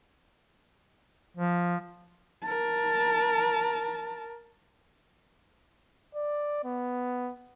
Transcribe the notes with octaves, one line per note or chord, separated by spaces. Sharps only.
F3
A#4 A5
D5
B3